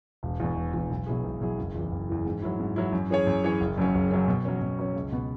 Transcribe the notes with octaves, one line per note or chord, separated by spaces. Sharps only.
E1
E2 B2
E1
E2 B2
B1
B2 F#3 E4 G#4
B1
B2 F#3 E4 G#4
F#1
E2 E3
F#1
E2 E3
G#2
F#3 E4
G#2
F#3 E4
F#2
E3 C#4 G#4 C#5
F#2
E3 C#4 G#4 C#5
F#1
F#2 F#3 C#4
F#1
F#2 F#3 C#4
B2
F#3 C#4
B2
F#3 C#4
C#2
B2 B3